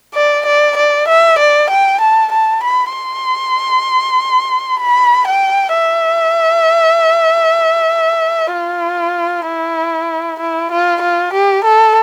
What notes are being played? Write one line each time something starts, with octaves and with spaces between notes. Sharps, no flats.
D5
D5
D5
E5
D5
G5
A5
A5
B5
C6
B5
G5
E5
F4
E4
E4
F4
F4
G4
A4